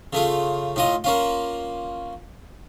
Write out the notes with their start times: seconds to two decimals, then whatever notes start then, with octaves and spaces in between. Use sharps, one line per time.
0.13 C#3 A3 F4
0.76 A2 F4 D#5
1.04 A#3 C#4 F4